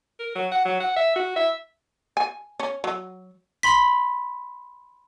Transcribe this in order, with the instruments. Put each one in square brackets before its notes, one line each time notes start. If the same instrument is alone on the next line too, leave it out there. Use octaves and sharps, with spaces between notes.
[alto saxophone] A#4
F#3
F#5
F#3
F#5
E5
F#4
E5
[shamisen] G#5
C#4
F#3
[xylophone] B5 C6 B6